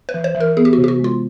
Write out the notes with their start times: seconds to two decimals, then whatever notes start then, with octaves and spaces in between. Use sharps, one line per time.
0.09 B4
0.14 E3
0.24 C5
0.35 E3
0.40 A#4
0.57 B3 G#4
0.65 G4
0.73 C3 F#4
0.84 G4
0.88 F#4
0.99 G#3 F4